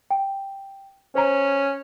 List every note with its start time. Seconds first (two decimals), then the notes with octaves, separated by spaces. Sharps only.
0.11 G5
1.15 C#4 C5 A#5